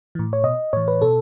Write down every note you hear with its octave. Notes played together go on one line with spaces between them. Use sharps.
A2 E3
C#5
B2 D#5
A2 E3 C#5
B4
B2 A4